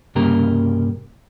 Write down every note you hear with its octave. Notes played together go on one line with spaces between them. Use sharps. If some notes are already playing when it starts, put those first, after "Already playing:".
C2 G2 C#3 A#3 G4 A#4